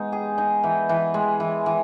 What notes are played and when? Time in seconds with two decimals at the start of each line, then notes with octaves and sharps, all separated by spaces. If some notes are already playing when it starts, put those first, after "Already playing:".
Already playing: G#3 B3 D#4
0.12 G#4
0.38 D#4
0.63 E3
0.89 E3
1.14 G#3
1.40 E3
1.66 E3